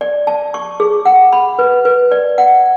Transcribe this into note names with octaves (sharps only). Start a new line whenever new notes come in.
D5
A5
C#6
G#4
F#5
B5
B4
B4
D5
F#5